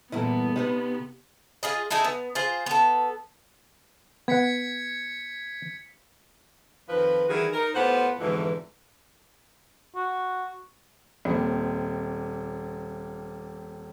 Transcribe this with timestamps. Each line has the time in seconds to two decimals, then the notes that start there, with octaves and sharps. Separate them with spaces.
0.12 E2 G2 A#2 B3 E4 A4
0.56 C3 D#4 G4 B4
1.63 F4 G#4 D#5
1.91 D#4 E4 G#4 A4
2.04 B3
2.35 F4 G#4 C5
2.66 B3 A4
4.28 B3 F#5 G#6 B6 C#7
6.89 F2 D#3 F3 B4
7.29 D#3 E3 G3 E4 F#4 G#4
7.53 D#4 A#4
7.75 A2 B3 F4 G4 C5 F#5
8.20 F2 G#2 B2 D3 E3
9.95 F#4
11.25 D#1 A#2 C4